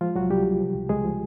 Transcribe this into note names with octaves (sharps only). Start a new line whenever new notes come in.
F3 G#3 F4
C2 F#3 F#4
C2 G3 G4
C3
F3
C#2
C#2 G#3 G#4
F3